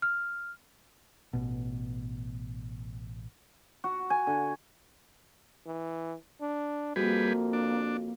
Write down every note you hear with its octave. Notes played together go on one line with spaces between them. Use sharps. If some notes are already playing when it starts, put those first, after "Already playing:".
F6
A1 B2
F#4
G#5
D3
E3
D4
F2 G3 A#3 F#4 G#4 B4
D4